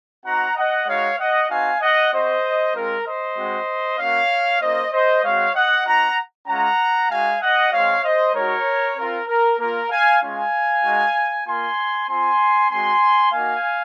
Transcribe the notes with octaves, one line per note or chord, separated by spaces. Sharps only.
C4 D#4 F#4 F#5 A#5
D#5 F#5
G#3 D#4 F#4 C#5 F5
D#5 F#5
C4 D#4 F#4 F5 G#5
D#5 F#5
C4 F#4 C5 D#5
G#3 C4 F4 A#4
C5 D#5
G#3 C4 F#4
A#3 C#4 F#4 C#5 F5
A#3 C#4 F4 C5 D#5
C5 D#5
G#3 C4 F#4 C#5 F5
D#5 F#5
C4 D#4 F#4 F#5 A#5
G#3 C#4 F4 F#5 A#5
G#3 D#4 F#4 F5 G#5
D#5 F#5
G#3 C4 F#4 C#5 F5
C5 D#5
G#3 D#4 F#4 A#4 C#5
C4 F4 A#4
A#4
A#3 F4 A#4
F5 G#5
G#3 C#4 F4 F5 G#5
G#3 D#4 F#4
A#3 F4 G#5 C6
C4 F4 G#5 C6
G#3 C4 F#4 G#5 C6
A#3 D#4 F#4 F5 G#5